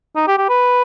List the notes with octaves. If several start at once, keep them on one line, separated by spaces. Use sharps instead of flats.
D#4
G4
G4
B4